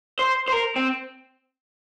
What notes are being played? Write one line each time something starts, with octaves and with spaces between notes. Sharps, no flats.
C5
C5
A#4
C4